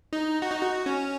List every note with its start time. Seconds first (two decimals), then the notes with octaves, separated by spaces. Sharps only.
0.13 D#4
0.42 F#4
0.51 D#4
0.62 F#4
0.86 C#4